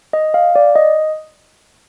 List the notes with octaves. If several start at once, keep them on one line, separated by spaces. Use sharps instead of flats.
D#5
F5
D5
D#5